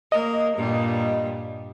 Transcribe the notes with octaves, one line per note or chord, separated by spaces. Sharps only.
A#3 A#4 D#5
G2 A#2 G3